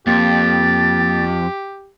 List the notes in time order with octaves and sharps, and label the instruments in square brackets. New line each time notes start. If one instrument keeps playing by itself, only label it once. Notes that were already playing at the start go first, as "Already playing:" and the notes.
[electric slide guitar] F2 [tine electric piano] A#3 [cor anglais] G4 [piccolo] A6